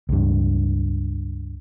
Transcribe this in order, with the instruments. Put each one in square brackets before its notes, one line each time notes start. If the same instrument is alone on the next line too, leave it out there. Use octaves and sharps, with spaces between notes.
[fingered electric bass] C#2 G2